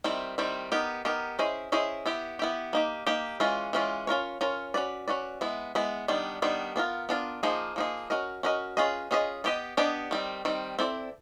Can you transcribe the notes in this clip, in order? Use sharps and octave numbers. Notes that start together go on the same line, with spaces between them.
D#3 G3 C4 E4
D#3 G3 C4 E4
B3 D#4 G4 A#4
B3 D#4 G4 A#4
C#4 E4 G#4 C5 D#5
C#4 E4 G#4 C5 D#5
B3 E4 G4
B3 E4 G4
A#3 D#4 G4
A#3 D#4 G4
E3 G#3 C#4 F4
E3 G#3 C#4 F4
C#4 F4 A#4 C#5
C#4 F4 A#4 C#5
C#4 F#4 B4 D5
C#4 F#4 B4 D5
G#3 B3 E4
G#3 B3 E4
D#3 G3 B3 D4
D#3 G3 B3 D4
B3 D4 F4 A#4
B3 D4 F4 A#4
F3 A#3 D#4 G#4
F3 A#3 D#4 G#4
C#4 F#4 A#4 D#5
C#4 F#4 A#4 D#5
C#4 F4 G#4 B4 D#5
C#4 F4 G#4 B4 D#5
B3 D4 G4 B4 D#5
B3 D4 G4 B4 D#5
D#3 G3 C4
D#3 G3 C4
C4 E4 A4 D5